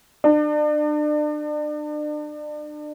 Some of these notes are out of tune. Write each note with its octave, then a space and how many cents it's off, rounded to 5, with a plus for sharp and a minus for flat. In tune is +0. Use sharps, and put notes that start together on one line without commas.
D4 +35